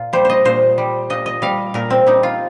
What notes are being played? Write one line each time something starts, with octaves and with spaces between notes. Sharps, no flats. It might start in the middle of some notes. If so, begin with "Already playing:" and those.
Already playing: A#2 F4
G3 C5
C5 D#5
A#2 C5
G3
A#2 D#5
D#5
G3 F5
A#2 A#4
C4
G3 D#4
F4